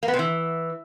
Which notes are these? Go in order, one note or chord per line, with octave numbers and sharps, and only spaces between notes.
A#3
B3
C3
E3